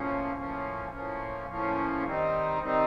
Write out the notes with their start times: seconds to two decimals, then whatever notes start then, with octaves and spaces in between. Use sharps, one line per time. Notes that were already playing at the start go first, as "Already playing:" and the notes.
Already playing: A2 F3 A#3 C#4
0.34 A2 F3 A#3 C#4
0.91 A2 F3 A#3 C#4
1.47 A2 F3 A#3 C#4
2.04 D#3 G3 C4 D#4
2.60 D#3 G3 C4 D#4